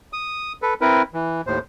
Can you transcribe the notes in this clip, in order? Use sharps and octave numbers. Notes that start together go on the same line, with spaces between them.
D#6
A4 B4
C4 E4 A#4 B4
E3
D#2 A2 C5